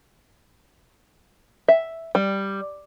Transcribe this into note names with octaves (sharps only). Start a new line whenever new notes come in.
E5
G3